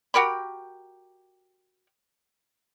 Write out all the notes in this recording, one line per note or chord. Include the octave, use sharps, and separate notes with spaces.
F#4 G4 A#4 B5